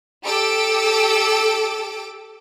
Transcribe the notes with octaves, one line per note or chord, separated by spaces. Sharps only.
G4 A4 D6 E6 D7